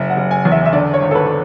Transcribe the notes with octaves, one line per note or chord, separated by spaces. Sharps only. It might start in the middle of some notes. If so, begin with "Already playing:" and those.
Already playing: F#1 E5
F#5
F#1
G#5
E2
E5
E5
D3 D5
C#5
G#1
A4
B4